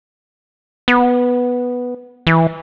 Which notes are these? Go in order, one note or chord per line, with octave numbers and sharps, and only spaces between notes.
B3
E3